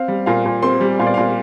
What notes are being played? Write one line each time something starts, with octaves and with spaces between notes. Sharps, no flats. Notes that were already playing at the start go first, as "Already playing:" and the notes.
Already playing: C4 F5
G3
A#2 F5
A#2
C4 C6
G3
A#2 F5
D5
A#2 F5